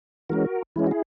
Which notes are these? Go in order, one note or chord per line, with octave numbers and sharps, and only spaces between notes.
E3 G#3 C#4 F#4 A#4
E3 G#3 C#4 E4
F#4
E4 G#4